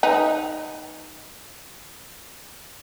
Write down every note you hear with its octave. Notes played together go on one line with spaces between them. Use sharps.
D#4 B4